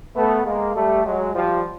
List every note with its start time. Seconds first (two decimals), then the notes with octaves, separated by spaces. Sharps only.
0.16 A3 B3
0.45 G#3 A#3
0.75 G3 A3
1.05 F#3 G#3
1.34 F3 G3